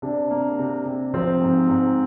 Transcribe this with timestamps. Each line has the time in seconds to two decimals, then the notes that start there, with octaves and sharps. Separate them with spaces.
0.02 C3 D4
0.30 A#3
0.58 C3
0.85 C3
1.14 F3 C4
1.42 G#2
1.69 G#2